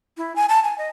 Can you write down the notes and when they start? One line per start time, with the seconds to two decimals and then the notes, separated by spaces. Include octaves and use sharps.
0.17 E4
0.36 G#5
0.49 A5
0.64 G#5
0.78 D#5